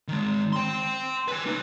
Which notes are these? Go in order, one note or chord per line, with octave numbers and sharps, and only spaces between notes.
D#3 G#3
G5 C6
B4 G#5
D#4 B4